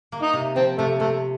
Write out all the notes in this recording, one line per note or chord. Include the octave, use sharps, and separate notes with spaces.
A#3
D#4
C3
F3 C4
C3 A3
C3 A3